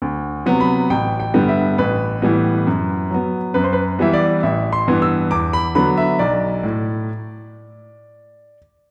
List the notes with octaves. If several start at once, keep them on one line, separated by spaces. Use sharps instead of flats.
D2
C3 F#3 B3
B5
A1 G5
G5
G2 D3 G3 B3
E5
A1 B4
A2 E3 G3 B3
F#2
F#3 B3
F#2 B4
C5
B4
E3 G3 B3 E5
D5
A1 E5
C6
G2 E3 B3
E6
E2 D6
B5
D3 F#3 B3 B5
E5
B1 D5
A2